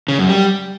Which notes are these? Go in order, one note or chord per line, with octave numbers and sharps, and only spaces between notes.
C#3
F#2
G3